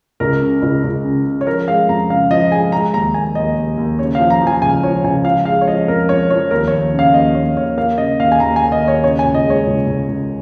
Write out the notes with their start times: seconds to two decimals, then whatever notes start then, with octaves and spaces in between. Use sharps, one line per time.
0.20 C#2 A#4
0.42 C#3
0.62 C#2
0.83 C#2
1.05 C#3
1.25 C#3
1.41 C#5
1.46 F3 A#4
1.68 G#3 F5
1.88 F2 A#5
2.10 C#3 F5
2.31 F3 D#5
2.52 G#3 G#5
2.72 G#3 A#5
2.94 D#2 A#5
3.14 D#2 G#5
3.35 D#2 D#5
3.56 D#2
3.77 D#2
3.99 C#3 C#5
4.15 F5
4.19 F3
4.30 A#5
4.42 F3
4.47 G#5
4.62 C#2 G#5
4.83 F3 C#5
5.04 C#2 G#5
5.25 F3 F5
5.45 G#3 F5
5.61 C#5
5.67 F3 D#5
5.87 F2 A#4
6.09 F2 C#5
6.30 F3 C#5
6.51 D#2 A#4
6.67 C#5
6.72 D#2
6.94 C#3
6.99 F5
7.14 D#2 D#5
7.35 D#2 C#5
7.56 D#2 C#5
7.77 A#3 F5
7.98 C#3 D#5
8.19 D#2 F5
8.32 G#5
8.40 D#2 A#5
8.56 G#5
8.61 D#2
8.72 D#5
8.83 D#2 C#5
9.04 C#3 C#5
9.19 G#5
9.25 C#2
9.34 D#5
9.46 G#3 C#5
9.66 C#2
9.87 C#2
10.08 C#2